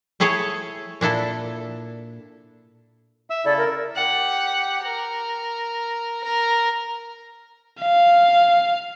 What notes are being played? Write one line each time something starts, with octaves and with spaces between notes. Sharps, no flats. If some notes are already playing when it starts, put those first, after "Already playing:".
A3 E4 G#4 A4 C#5
A#2 D4 E4 A4
E5 E6
C#3 E4 A4 D5
A#4
G4 F#5
A#4
A#4
F5